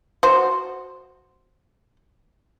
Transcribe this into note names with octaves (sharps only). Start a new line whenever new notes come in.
F#4 C5